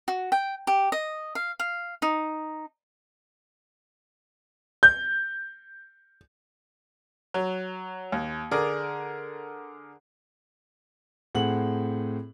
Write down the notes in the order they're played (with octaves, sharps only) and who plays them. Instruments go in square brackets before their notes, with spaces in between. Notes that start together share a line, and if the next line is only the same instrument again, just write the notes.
[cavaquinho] F#4
G5
G4
D#5
F5
F5
D#4
[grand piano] G6
[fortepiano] F#3
D#2
D3 G#4 A#4 D5
[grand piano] A2 C4 G#4 F#5 F#7